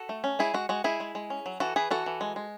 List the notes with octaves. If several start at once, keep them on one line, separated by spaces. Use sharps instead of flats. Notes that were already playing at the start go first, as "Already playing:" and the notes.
Already playing: F#4 A4
A3
C#4
G#3 E4 G#4
G#3 F#4
G#3 F#4
G#3 E4 G#4
G#3
G#3
C#4
F#3
E3 F#4 A4
E3 G#4 B4
E3 F#4 A4
E3
G#3
G#3